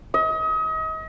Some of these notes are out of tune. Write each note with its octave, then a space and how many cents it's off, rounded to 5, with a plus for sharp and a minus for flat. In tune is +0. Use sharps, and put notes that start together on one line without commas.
D#5 +35